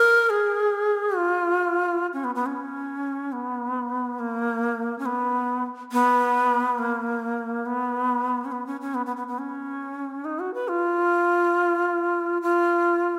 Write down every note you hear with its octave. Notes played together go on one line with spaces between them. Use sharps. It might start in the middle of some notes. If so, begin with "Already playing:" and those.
Already playing: A#4
G#4
F4
C#4
B3
B3
C#4
B3
A#3
C#4
B3
B3
A#3
B3
C#4
B3
C#4
C#4
B3
B3
B3
B3
C#4
D#4
F#4
B4
F4
F4